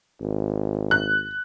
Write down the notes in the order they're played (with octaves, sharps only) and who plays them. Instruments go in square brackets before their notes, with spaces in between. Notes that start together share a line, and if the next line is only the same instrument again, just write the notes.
[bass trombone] G#1
[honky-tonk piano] F#6